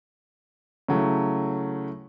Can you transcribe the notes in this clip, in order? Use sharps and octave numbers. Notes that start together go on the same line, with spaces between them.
C#3 F#3 A3 E4